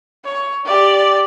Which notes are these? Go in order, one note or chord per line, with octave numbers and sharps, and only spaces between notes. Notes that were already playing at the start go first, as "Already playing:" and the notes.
C#5
G4 D5